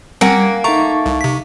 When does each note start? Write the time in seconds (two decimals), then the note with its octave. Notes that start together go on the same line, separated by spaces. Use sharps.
0.21 G3 A#3 C4 C#4 F#5 G#5
0.64 A3 D#4 A#5 C#6
1.06 C2
1.21 C3 B6